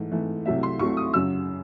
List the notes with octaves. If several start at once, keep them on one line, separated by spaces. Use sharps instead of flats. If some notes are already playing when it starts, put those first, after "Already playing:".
Already playing: G#2 E3 A3
G#2 E3 A3
C2 C3 F#3 A3 E5
C6
C2 C3 F#3 A3 C#6
D#6
F#2 C#3 F#3 E6